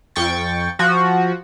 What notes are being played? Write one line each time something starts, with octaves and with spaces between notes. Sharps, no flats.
F2 G5 C#6 A6
F3 F#4